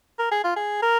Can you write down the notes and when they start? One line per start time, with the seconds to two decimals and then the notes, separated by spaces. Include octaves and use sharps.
0.19 A#4
0.32 G#4
0.44 F4
0.56 G#4
0.82 A#4